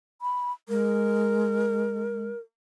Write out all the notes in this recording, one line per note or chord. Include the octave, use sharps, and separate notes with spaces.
B5
G#3 A#4